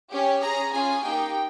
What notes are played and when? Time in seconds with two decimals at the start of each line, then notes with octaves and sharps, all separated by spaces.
0.11 C#4 G4
0.41 C#4 G#4 A#5
0.73 C#4 F4 G#4 G#5
1.04 A#3 D#4 G4 G5